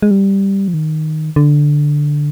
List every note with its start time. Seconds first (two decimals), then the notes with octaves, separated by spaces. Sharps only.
0.02 G#3
0.11 G3
0.68 F3
0.74 D#3
1.36 D3